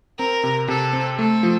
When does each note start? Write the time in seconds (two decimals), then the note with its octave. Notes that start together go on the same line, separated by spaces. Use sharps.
0.18 C4 A#4
0.44 C3
0.68 C3 A4
0.93 C4
1.18 A3 A4
1.43 F3